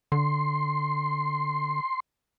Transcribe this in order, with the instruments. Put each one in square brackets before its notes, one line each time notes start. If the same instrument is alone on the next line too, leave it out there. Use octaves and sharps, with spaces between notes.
[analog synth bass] D3 [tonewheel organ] C6